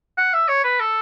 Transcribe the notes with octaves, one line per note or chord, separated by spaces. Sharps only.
F#5
E5
C#5
B4
A4